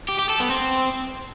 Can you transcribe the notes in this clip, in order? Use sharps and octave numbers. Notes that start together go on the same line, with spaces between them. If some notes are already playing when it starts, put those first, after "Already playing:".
G4
G4
A4
B3
C4